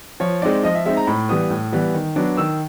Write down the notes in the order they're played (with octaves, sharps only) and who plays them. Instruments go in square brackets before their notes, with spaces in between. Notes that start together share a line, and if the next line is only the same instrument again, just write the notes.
[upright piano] F3 C#5
G#3 C4 D#4 D5
F3 D#5
E5
G#3 C4 D#4 E5
A#5
A2 B5
E3 G3 B3 D#6
A2
E3 G3 B3
D#3
F#3 B3 D4
D#3 E6